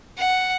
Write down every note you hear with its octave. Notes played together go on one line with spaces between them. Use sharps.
F#5